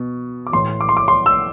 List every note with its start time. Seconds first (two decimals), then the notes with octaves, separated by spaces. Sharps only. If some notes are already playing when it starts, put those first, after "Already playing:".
Already playing: B2
0.47 D6
0.52 A2 E3 C6
0.81 D6
0.89 C6
0.97 D6
1.08 C6
1.26 E6